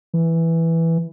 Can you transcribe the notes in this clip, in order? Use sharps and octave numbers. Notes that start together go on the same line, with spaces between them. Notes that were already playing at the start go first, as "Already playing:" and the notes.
E3